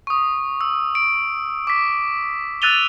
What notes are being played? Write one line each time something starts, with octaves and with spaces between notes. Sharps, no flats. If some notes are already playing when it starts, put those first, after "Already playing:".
C#6 D#6
E6
D7
D6 B6
E6 F#6 A6 D#7 F7 G7